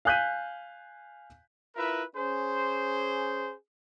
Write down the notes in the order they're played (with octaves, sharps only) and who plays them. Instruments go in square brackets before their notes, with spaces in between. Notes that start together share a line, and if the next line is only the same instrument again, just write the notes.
[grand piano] F5 G#5 F#6 G6 B6 D#7
[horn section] E4 F4 A#4 B4 E5
C#4 G#4 C5